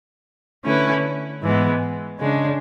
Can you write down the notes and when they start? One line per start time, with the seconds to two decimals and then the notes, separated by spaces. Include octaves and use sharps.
0.65 D3 A3 C#4 E4 B4
1.42 G#2 E3 G#3 B3
2.20 C#3 G#3 D4